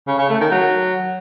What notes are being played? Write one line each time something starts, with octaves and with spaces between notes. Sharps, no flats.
C#3
C#3
A3
D#3
F#3